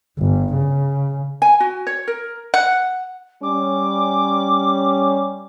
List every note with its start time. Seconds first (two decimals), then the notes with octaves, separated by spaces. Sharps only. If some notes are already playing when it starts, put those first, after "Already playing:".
0.19 G1
0.55 C#3
1.42 G#5
1.60 F#4
1.87 C#5
2.08 A#4
2.54 F#5
3.43 G3 C#4 D6